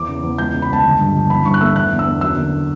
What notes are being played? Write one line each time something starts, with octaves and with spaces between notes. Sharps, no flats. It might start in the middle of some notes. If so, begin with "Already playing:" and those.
Already playing: E2 D6
C#3
E2
C#2 G6
C#3
B5
C#2 A5
G1
G2
G1
A1 B5
G2 C#6
F#6
A3 E6
E2 F#6
D3
E6
E2
F#2 E6
D3